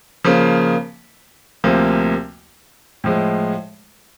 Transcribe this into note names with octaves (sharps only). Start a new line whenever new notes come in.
C#3 F3 A#3
D2 C3 F3 A#3
A2 F3 G#3